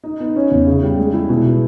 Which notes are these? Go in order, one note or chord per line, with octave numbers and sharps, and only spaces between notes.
D#4
B3
C#4
E2
C#3
G3
G#3
E4
B2
B2